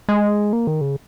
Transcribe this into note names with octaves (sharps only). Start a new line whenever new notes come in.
G#3
A#3
D#3
C#3